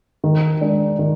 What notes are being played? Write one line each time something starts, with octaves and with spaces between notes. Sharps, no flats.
D#3
G#3 D4
D#3